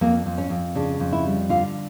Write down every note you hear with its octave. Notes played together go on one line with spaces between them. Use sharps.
F2 A#3
F2
C#4
F2
C#3 D4
F2
E4
G3
D3 F4